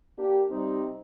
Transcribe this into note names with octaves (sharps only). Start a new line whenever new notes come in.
A#3 D4 G4
C3 G3 C4 D#4